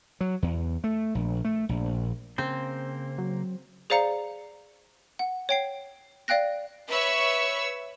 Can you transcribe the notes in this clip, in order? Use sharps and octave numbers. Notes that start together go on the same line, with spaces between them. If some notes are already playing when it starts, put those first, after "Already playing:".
F#3
E2
A3
A#1
A3
A#1
C#3 A#3 C4 C5
F#3
G#4 C5 D5 F5 A#5 C#7
F#5
C#5 G5 C7
D5 F5 G5 F#6 A#6
B4 C#5 E5 C#6 E6